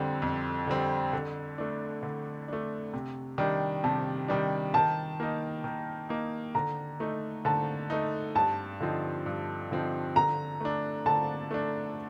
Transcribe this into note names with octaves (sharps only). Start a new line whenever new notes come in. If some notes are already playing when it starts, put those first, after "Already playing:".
Already playing: F2 D3 G3 C4
F2
D3 G3 C4
D3
A3 D4
D3
A3 D4
C3
D#3 G3 D4
C3 A5
D#3 G3 D4
D#3 A5
A#3 D#4
D#3
A#3 D#4
D3 A#5
A3 D#4
D3 A5
A3 D#4
G2 A5
D3 F3 C4 D#4
G2
D3 F3 C4 D#4
D3 A#5
A3 D4
D3 A5
A3 D4